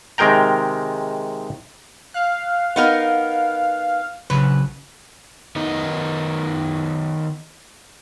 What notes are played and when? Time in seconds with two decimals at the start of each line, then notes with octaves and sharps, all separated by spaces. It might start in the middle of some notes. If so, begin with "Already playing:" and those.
0.18 C3 D#3 G#3 A#4 G5 A#5
2.14 F5 F#6
2.76 B3 D#4 A#4
4.30 A#1 C#3 F#3 B4
5.56 D#3 B3 D#4